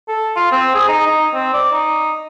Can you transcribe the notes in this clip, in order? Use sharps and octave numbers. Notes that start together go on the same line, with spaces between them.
A4
F4
C4
G#4
D#4
D#4
C4
D5
D#4